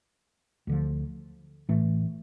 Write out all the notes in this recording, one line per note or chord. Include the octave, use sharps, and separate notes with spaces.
D2 D3 F3
A1 A2 E3 A3